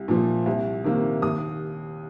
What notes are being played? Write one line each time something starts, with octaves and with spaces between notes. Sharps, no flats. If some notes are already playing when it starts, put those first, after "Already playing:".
Already playing: C2
A#2 F3
C2
C3 D#3 A#3
D#2 D#6